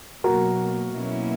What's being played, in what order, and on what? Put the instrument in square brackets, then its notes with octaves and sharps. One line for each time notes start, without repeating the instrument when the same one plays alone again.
[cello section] B2 F#3 A#3 [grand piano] F#4 A#4
[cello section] B2 F#3 A#3 C#4 E4